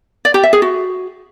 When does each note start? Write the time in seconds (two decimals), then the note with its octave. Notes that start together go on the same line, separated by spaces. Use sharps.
0.25 D5
0.34 G4
0.43 E5
0.53 G#4
0.62 F#4